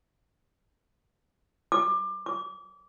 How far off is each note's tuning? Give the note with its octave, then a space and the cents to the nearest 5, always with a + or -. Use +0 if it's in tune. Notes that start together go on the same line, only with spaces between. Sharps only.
D6 +25
D6 -30